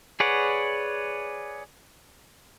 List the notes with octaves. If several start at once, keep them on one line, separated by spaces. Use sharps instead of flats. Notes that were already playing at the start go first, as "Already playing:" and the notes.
G#4 B4 C#5 D5 F#5